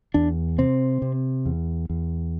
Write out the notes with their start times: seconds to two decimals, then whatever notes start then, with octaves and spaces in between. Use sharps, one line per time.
0.14 E2 D4
0.58 C3 C4
1.02 C3
1.46 E2
1.90 E2